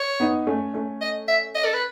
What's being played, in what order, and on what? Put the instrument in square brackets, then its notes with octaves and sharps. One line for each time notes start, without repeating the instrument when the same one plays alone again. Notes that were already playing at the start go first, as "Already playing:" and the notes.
Already playing: [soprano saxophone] C#5
[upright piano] B3 D#4
A3 C#4
A3 C#4
[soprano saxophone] D#5
E5
D#5
A4
B4